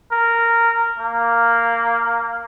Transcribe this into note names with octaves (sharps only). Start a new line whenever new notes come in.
A#4
A#3